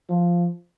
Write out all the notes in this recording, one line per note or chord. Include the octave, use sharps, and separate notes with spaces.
F3